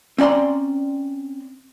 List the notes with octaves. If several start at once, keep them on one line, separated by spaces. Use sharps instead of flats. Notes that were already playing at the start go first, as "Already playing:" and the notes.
C4 C#4 D5 A#5 C6